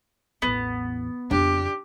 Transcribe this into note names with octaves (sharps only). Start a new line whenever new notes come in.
A1 E2 B3
F2 C#3 D4 G4